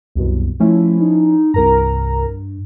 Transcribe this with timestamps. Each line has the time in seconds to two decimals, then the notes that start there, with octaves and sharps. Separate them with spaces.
0.15 C2 F#2 B2
0.60 F3 A3 C#4 E4
1.01 D#4
1.54 C2 G2 A#4 A#5